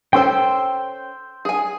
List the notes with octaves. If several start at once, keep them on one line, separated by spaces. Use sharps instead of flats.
C#4 A4 C5 G5 C6 E6
G#4 G#5